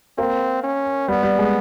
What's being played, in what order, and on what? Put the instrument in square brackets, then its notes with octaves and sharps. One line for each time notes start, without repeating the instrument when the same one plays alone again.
[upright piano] A#3 [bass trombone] C4
[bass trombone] C#4
[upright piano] G3 [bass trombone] B3
[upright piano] G3
G#3